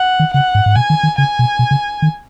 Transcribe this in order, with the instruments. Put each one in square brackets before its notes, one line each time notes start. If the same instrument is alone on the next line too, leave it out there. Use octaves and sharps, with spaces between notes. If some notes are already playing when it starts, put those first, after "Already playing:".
Already playing: [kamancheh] F#5
[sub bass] D#3
[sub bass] C#3 [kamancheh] F#5
[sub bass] G#2
G#2
[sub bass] B2 [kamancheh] G#5
[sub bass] D#3
D#3
[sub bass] C#3 [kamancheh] G#5
[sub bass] B2
B2
C#3
D#3